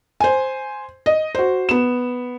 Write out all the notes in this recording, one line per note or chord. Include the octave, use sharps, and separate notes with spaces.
C5 G#5
D#5
F#4 C5
B3 E7